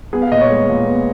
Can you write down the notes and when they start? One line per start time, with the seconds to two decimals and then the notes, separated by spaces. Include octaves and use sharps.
0.13 B3 G#4
0.22 F5
0.32 A#2 D#5
0.41 C#5
0.50 G#3
0.69 A#2
0.86 B3